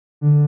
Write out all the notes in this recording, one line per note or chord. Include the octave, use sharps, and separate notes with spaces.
D3